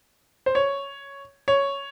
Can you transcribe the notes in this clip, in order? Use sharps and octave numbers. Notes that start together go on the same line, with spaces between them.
C5
C#5
C#5